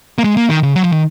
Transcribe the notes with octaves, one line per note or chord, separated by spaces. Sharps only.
A#3
G#3
A#3
D#3
C#3
F#3
F3
D#3